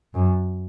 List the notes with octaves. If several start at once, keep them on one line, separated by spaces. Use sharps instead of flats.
F#2